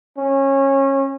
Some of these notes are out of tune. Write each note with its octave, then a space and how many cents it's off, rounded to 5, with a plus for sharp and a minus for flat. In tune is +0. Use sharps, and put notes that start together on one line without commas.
C#4 -25